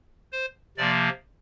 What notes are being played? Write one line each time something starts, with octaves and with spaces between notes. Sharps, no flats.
C5
C3 F3 A#3 D5